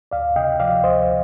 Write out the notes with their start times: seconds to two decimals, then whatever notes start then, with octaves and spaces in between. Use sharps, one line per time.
0.11 D2 D5 F5
0.36 C3 D#5 G5
0.60 F3 D5 F5
0.84 D2 C5 D#5